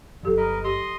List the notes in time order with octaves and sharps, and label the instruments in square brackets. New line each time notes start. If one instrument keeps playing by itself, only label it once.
[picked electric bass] G1 [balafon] F#3 G4 A4
[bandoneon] A#4 B4 D#5
[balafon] G4 [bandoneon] D#5 C6 D#6